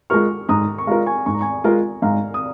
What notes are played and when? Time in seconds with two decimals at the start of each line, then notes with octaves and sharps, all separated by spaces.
0.10 G#3 F4 A#4 C#6 F6
0.49 G#2 A#5 D#6
0.78 C#6
0.87 G#3 F4 A#4 F5 A#5
1.06 G#5 C#6
1.26 G#2 C#6
1.34 A#5
1.41 G#5 C#6
1.64 G#3 F4 A#4
2.02 G#2 F5 A#5
2.34 D#6